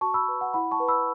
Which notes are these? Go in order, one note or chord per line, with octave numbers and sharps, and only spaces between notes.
F#4 A5 C#6
B5 E6
B4
F#5
E4 F#5 B5
A5 C#6
B4
B5 E6